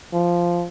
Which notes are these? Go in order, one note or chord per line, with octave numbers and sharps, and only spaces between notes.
F3